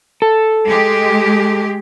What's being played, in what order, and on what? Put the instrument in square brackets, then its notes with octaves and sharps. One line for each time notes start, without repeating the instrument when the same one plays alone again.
[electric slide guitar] A4
[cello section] G#3 G4